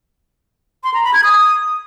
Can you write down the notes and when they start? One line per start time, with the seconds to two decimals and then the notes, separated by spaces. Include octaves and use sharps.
0.84 C6
0.94 A#5
1.04 B5
1.14 G#6
1.24 D#6